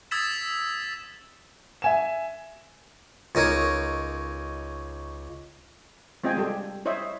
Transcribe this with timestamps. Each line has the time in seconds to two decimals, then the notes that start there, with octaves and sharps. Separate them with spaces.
0.11 D#6 E6 G#6 A6 B6 E7
1.82 E5 G#5 E7
3.35 C#2 D#4 A#4 C#5
6.24 G#3 C4 F4 D#5 G5 G#5
6.37 G3 G4 A4
6.85 E4 C5 C#5 D#5 E5